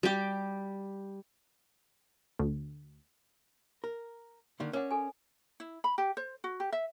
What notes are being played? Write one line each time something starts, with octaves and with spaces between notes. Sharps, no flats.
G3 G4
D2
A#4
D3 D#3 A#3
C#4 A#4 D5 F#5
A4 G#5
E4
B5
G4
C5
F#4
G4
E5